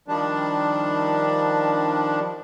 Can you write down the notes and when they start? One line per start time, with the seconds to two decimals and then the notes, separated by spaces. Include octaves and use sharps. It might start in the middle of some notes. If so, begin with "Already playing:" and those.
0.08 D#3 F3 G3 D4